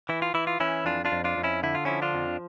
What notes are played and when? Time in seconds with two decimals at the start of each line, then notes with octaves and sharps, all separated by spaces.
0.09 E3 E4
0.22 F4
0.34 E3 E4
0.47 F4
0.60 E3 C#4 E4
0.85 F2 D4 F4
1.05 D4 F4
1.12 F2
1.24 D4 F4
1.37 F2
1.43 C#4 E4
1.63 D3 E4
1.75 F4
1.85 F3 C#4 E4
2.02 D4 F4
2.14 F2